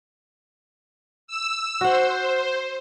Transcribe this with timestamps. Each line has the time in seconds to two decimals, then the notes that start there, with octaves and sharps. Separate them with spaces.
1.27 E6
1.81 F#4 C5 F#5